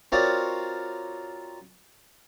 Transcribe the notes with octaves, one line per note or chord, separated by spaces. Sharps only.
C4 F4 F#4 A#4 C#5 D5